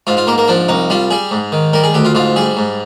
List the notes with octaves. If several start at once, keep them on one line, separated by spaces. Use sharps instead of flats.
G#2 F4
F4
G#2 A#3
A#3
F3 D4
C2 D#4
G3 F4
G3 G#4
G#2
D#3
G3 A#4
G#4
D2 G4
F4
G#2 F4
G3 G#4
G#2